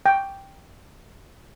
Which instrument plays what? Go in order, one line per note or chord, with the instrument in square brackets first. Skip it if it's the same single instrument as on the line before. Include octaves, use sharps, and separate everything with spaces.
[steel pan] G5